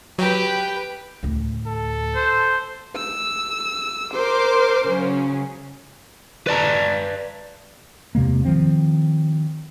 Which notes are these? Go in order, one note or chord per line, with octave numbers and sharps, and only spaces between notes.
F#3 G4 B4 G5
D2 A2
A4
C5
E6
A#4 C5 C6 D6
C#3 F#3 C#4
B4 D5 A5 A#5
E2 C3 G#3 A#3
D#3 F3 C4